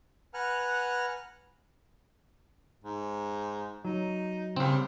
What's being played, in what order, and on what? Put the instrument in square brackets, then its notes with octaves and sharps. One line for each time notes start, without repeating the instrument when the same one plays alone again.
[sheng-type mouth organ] B4 F#5 G#5 A#5 F6 F#6
[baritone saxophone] G#2
[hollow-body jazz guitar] F#3 [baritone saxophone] D#4
[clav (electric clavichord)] C2 C4 [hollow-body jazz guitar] C#3 [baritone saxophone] G3